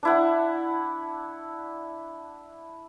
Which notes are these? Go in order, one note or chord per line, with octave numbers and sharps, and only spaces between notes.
D4 E4 F#5